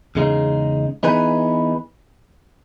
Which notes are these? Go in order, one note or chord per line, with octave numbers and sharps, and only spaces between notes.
E2 C#3 G#3 D#4
E3 B3 D#4 G#4 B4